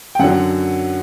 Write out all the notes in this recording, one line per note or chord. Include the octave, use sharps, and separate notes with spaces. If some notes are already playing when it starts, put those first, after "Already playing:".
G5
F#2 D3 F#3 F#5